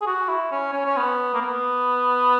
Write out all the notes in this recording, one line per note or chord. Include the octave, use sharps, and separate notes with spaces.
G#4
F#4
E4
C#4
C#4
C#4
B3
A#3
B3